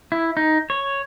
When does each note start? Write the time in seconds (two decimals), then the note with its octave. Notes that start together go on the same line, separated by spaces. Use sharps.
0.12 E4
0.37 D#4
0.70 C#5